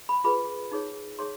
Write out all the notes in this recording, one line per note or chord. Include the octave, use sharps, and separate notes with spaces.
B5
F4 G#4 B4 B5
D#4 G#4 C#5
D#4 G#4 C#5 C6